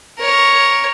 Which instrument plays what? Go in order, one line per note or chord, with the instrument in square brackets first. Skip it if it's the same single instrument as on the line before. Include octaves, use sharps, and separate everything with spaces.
[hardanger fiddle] A#4 C#5